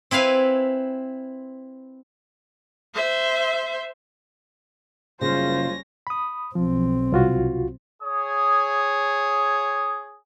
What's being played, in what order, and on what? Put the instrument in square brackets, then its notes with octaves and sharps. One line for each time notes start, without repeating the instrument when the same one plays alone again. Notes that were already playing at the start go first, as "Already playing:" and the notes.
[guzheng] C4 E4 B4 F5 G#5
[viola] C5 E5
[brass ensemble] F#1 F4 [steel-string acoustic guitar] C#3 [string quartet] G3 C#4 A#6 [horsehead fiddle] C5
[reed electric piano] B5 D#6
[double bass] B1 C4 [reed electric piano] F3
[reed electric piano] C2 F4 F#4
[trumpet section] G#4 C#5 D#6